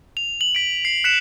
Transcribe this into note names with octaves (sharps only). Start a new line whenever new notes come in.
F7
F#7
B6 D7
C7
F#6 B6 C#7 E7 F7